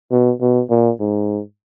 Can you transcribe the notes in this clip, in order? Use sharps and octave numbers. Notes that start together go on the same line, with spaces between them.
B2
B2
A#2
G#2